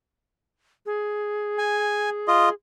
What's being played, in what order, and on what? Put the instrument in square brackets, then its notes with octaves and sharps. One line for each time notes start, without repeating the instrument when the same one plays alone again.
[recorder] G#4
[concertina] G#5
F4 D#5